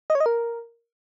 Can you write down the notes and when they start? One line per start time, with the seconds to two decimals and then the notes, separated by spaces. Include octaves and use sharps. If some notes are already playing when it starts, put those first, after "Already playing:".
0.10 D#5
0.15 C#5
0.20 D#5
0.26 A#4